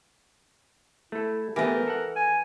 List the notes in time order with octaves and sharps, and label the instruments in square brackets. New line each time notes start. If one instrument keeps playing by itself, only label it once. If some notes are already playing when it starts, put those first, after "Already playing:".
[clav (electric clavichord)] A3 A4 [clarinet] E4
[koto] E3 D#5 [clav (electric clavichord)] A3 B3 G4 [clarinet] A#4
[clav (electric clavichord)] A4 F#5
[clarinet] G#5